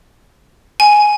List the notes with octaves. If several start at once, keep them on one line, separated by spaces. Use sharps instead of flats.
G#5